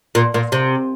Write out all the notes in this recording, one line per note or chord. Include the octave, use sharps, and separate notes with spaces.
A#2
A#2
C3